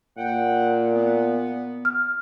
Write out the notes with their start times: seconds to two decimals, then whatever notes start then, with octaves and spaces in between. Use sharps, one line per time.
0.18 A#2 F#5 G5
0.93 B3
1.85 F6